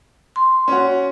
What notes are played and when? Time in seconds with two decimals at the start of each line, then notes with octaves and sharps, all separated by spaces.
0.36 C6
0.68 C#4 F#4